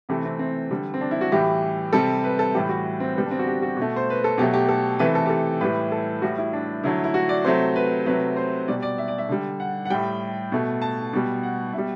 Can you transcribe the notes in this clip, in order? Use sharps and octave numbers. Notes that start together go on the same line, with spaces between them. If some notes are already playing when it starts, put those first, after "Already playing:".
C3 E3 A3 G4
C4
C4
D3 G3
C4
D4
E4
F#4
A2 E3 G3 G4
C3 G3 A4
B4
A4
A2 E3 G3 G4
F#4
C4
D3 G3 B3
D4
C4
F#4
G4
F#4
B2 A3 F#4
C5
B4
A4
B2 F#3 A3 G4
G4
A4
C3 E3 A3 B4
A4
G4
A4
A2 E3 G3 B4
A4
A2 G3 F#4
E4
D4
D3 F#3 A3 E4
E4
F#4
D5
C3 F#3 A3 C5
B4
C3 F#3 A3 B4
C5
B2 G3 D5
D5
E5
D5
E5
D3 G3
F#5
F#5
A2 G3 G5
B2 A3
A5
B2 G3
F#5
B2 G3 E5